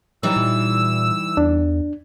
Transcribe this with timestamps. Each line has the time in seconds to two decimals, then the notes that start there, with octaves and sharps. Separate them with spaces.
0.23 E3 F#3 G3 D#4 E6
0.36 A#2
1.37 E2 D4